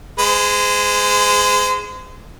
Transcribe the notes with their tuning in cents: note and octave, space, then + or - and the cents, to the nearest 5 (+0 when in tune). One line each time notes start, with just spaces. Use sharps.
G#3 +0 C5 -35